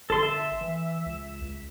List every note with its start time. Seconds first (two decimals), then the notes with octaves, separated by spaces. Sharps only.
0.10 G1 A4 C6
0.23 E5
0.61 E3
1.06 C#2
1.41 C#2